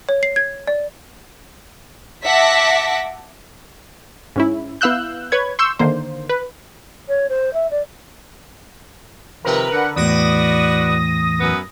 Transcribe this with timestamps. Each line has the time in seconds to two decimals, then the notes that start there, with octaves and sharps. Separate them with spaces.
0.09 C#5
0.23 C7
0.36 G#6
0.67 D5
2.24 E5 F#5 A5 D6 A#6 B6
4.36 G#2 C#4 E4
4.81 B3 E4 F5 E6 F#6 G6
5.32 B4 C#5 G#6
5.59 C6 C#6 E6 G6
5.79 D3 D#3 A#3 C5
6.29 B4
7.08 C#5
7.29 C5
7.53 E5
7.70 D5
9.45 C3 D#3 F3 A#4 B4
9.72 D3 F#5
9.96 E2 A2 F#4 B4 D5 D#6 A#6
11.40 F#2 B3 B4